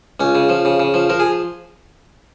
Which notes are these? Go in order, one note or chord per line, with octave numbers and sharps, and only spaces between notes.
C#2 C#4
C#3
F3
C#3
C#3
F3
F3 A#4
G#4